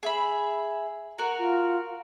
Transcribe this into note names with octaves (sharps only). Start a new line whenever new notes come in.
G#4 E5 B5
F#4 A#4 A#5
F4